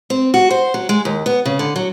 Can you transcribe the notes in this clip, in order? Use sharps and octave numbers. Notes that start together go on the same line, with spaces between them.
C4
F#4
C5
F#3
G#3
D#2
B3
C#3
D3
F#3